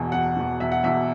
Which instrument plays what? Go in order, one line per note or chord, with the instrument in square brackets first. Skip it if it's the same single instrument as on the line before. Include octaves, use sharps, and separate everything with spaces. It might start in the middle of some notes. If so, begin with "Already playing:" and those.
Already playing: [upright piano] E1 E2 B2
E1 F#5
E2 B2
E1 E5
F#5
E2 B2 E5